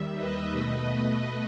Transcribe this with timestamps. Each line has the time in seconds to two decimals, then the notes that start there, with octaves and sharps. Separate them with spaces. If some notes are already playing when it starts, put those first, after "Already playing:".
Already playing: D#2 D#3 G3 E5
0.16 B4 D#5
0.52 B2 A3